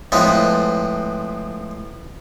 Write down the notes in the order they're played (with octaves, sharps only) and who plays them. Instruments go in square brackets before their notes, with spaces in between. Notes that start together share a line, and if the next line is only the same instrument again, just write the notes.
[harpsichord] A2 F3 G#3 B3 C4